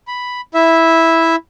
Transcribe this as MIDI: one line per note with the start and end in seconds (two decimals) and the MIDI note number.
0.07 0.41 83
0.54 1.36 64
0.54 1.36 76